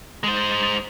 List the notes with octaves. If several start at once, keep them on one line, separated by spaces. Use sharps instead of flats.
G#3 C5